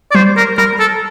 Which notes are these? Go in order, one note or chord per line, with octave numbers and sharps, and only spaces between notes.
D5
G3 C5
A#4
G3 A#4
A4